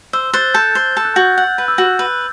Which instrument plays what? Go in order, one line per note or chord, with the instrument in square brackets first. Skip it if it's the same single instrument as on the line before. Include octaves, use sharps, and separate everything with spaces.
[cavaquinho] C5 [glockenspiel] E6
[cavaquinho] C5 [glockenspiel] F#6 A6
[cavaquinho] A4 [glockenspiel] G6
[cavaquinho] C5
A4
[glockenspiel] F#6
[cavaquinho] F#4 [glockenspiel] G6
[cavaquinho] F#5
B4
[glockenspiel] E6
[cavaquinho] F#4 [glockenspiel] F#6
[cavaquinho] B4